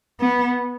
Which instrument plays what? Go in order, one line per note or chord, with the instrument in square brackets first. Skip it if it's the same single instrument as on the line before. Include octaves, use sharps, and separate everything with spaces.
[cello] B3